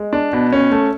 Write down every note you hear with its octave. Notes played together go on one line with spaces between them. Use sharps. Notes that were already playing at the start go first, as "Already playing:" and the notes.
Already playing: G#3
D4
B2
C#4
A3